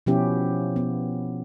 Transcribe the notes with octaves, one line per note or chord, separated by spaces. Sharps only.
B2 F3 B3 C#4 E4 G4
B3